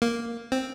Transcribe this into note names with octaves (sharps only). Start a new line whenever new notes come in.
A#3
C4